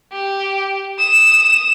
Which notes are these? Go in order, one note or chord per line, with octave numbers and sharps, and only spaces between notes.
G4
D#6 E7